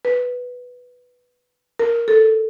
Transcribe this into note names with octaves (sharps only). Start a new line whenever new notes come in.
B4
A#4
A4